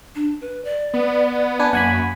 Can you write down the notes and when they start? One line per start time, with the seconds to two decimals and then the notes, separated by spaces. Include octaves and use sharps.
0.15 D4
0.41 B4
0.65 D5
0.94 B3
1.59 D4 B4 G#5
1.73 F#2 A#3 F#5 G#5 B5